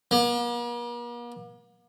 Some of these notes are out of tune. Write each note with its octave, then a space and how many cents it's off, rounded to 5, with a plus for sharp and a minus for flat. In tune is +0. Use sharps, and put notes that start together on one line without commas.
A#3 +45